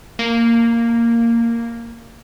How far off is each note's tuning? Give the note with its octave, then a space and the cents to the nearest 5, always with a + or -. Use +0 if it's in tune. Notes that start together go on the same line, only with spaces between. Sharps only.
A#3 -10